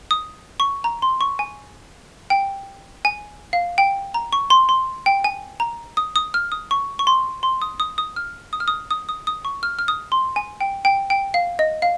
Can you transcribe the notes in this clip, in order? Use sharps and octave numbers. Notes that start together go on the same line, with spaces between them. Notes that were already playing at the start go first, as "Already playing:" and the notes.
D#6
C#6
A#5
C6
C#6
G#5
G5
G#5
F5
G5
A#5
C#6
C6
C6
G5
G#5
A#5
D#6
D#6
F6
D#6
C#6
C#6
C6
C6
D#6
D#6
D#6
F6
D#6
F6
D#6
D#6
D#6
D#6
C#6
F6
F6
D#6
C6
G#5
G5
G5
G5
F5
D#5
F5